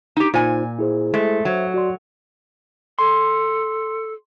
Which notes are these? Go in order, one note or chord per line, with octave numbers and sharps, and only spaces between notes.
D#4 G4
A#2 D#4 F4 C5 G#5
E4 G#4 C5
G#3 A3
F#3 C5 E5
F#4 D5 C6
A4 C6